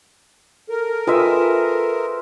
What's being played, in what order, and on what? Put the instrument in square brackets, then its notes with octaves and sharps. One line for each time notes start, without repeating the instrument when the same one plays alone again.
[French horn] A4 [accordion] A#4
[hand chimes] F4 B4 [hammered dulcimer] G#4 C5 E5